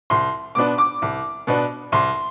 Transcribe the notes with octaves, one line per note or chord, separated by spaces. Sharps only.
C2 C6
B2 B3 D4 D6
D6
C2
B2 B3 D4
C2 C6